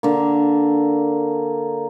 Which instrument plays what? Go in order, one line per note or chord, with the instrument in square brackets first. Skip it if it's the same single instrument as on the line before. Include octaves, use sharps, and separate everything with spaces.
[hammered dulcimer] D3 A#3